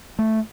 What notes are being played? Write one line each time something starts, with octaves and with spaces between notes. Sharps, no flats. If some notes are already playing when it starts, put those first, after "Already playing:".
A3